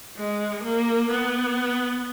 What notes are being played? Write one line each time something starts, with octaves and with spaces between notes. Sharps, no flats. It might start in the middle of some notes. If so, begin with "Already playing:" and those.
G#3
A#3
B3